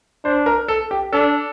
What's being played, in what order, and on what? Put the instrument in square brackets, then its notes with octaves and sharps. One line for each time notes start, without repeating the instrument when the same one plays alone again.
[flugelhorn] D4 [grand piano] C5
[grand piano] A#4
A4
G4
[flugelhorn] D4 [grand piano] A4